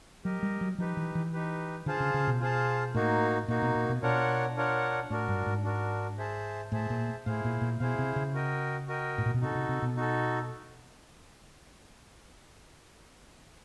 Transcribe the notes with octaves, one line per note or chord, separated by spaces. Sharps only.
F#3 G4 A#4 D#5
G3
F#3
F3 D#4 G4 B4
E3
E3
D#4 G4 B4
D3 F4 G#4 C5 F5 A5
C#3
C#3
B2
F4 G#4 C5 F5 A5
A2 A#3 D#4 F#4
A#2 A#3 D#4 F#4
B2
A#2
B2
B2 D4 F4 A#4 C#5 F#5
D4 F4 A#4 C#5 F#5
A2 D4 F#4 A#4
G2
G#2
D4 F#4 A#4
G#4 C5 E5 A5
A2 G#4 C5 E5 A5
A#2
A2 E4 G#4 C5 F5
A#2
A#2
B2 E4 G#4 C5 F5
C3
C#3
F#4 A#4 D#5 G5
F#4 A#4 D#5 G5
A2
A#2
B2
C3 D#4 F#4 A4
C3
C3
B2
D#4 F#4 A4